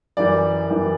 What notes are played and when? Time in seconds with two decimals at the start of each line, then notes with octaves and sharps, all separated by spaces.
0.17 F#2 E3 G3 D5
0.70 F#2 E3 G3